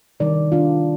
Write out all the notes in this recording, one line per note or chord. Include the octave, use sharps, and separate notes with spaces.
C3 D#3 G3 A#4 D5
D4 F4